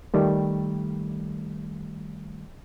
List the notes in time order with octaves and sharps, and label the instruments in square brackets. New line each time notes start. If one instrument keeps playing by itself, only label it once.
[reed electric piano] D#3 G3 A3